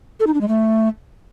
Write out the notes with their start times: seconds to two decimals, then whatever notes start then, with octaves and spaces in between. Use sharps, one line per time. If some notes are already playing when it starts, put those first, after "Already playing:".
0.20 A4
0.27 D#4
0.34 D4
0.41 G#3
0.48 A3